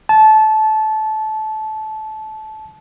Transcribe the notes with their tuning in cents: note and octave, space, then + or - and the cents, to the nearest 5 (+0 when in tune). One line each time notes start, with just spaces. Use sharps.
A5 -20